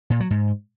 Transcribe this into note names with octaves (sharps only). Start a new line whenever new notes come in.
A#2
F#3
G#2